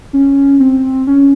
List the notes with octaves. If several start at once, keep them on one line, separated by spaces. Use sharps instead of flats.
C#4
C4
C#4